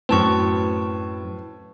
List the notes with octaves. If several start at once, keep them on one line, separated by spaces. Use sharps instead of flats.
F#2 A2 C4 B4 A5 C#6